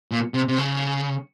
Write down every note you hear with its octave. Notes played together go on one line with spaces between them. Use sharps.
A#2
C3
C3
C#3